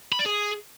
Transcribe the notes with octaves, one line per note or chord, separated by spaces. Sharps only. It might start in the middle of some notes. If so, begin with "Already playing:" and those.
B5
D5
G#4